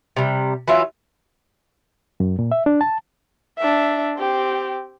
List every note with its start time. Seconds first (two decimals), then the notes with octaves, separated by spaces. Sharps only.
0.16 C3 G3
0.68 E3 F#3 F4 E5
2.20 F#2
2.39 A#2
2.52 E5
2.66 D4
2.81 A5
3.58 D4 E5
4.18 C4 G4